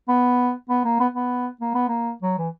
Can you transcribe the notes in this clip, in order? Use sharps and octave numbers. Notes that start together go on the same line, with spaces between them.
B3
B3
A#3
B3
B3
A#3
B3
A#3
F#3
E3